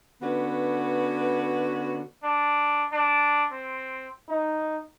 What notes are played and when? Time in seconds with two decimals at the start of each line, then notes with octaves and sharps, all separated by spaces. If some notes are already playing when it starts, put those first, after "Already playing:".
0.22 D3 B3 C#4 F#4 B4
2.24 D4
2.92 D4
3.52 C4
4.29 D#4